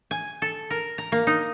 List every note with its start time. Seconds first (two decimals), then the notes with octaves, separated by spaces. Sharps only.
0.11 G#5
0.42 A4
0.70 A#4
0.98 A#5
1.12 A#3
1.27 D#4